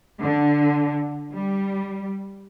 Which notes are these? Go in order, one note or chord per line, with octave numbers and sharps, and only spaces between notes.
D3
G3